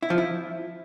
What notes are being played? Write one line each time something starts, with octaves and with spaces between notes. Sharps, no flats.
E4
F3
E4